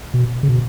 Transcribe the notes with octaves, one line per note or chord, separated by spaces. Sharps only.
B2
C#3
B2